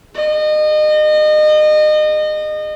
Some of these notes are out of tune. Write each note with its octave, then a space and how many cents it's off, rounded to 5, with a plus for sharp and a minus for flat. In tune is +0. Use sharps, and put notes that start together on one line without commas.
G#4 -30 D#5 -30